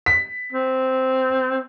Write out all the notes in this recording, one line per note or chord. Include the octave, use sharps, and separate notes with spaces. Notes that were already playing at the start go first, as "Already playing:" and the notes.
B6
C4